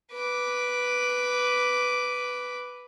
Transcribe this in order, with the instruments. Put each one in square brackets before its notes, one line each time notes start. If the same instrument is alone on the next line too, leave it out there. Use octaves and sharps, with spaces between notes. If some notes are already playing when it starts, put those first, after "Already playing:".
[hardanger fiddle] B4 D6